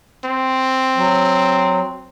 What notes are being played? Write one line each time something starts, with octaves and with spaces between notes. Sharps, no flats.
C4
F#3